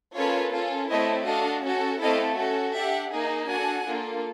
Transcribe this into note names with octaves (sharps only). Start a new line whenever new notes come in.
A#3 C#4 F4 A4 B4 C#5
C#4 F4 A4
A3 C4 E4 C#5 D#5
D4 F#4 A4 D#5 F5
C#4 F#4 A4
A3 C4 E4 A4 D#5 F5
C#4 F#4 A4
D4 G4 E5 F#5
A#3 D#4 G#4
D4 F#4 A4 F#5 G#5
A#3 D4 F4 A4